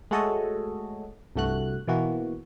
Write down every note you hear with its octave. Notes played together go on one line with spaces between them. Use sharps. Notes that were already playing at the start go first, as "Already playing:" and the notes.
G#3 A3 F#4 A4 C#5 D#5
C2 G2 A3 F#4 F#6
B2 E3 A#3 F#4